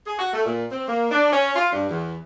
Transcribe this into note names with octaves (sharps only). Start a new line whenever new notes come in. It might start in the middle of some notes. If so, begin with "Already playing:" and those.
G#4
F#4
A3
A#2
C4
A#3
D4
C#4
F4
G2
E2